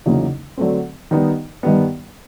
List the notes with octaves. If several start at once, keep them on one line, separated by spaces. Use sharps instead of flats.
E2 C#3 F#3 A#3 D#4
D3 F#3 A3 C4
D#3 G3 B3 D#4
G2 D#3 G3 B3